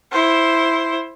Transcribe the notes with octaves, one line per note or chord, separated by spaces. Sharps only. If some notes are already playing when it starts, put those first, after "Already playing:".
E4 C5